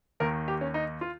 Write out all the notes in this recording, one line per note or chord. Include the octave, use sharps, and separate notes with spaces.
D#2 D#3 A#4
G4
C#4
D#4
F4